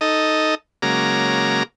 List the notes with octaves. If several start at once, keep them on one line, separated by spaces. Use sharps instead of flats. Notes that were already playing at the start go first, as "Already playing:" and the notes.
D#4 A4 D#5
C#3 F#3 G#3 A#3 A#5 D6